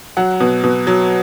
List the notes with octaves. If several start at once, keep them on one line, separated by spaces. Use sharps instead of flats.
F#3 F#5
B2
B2
F#3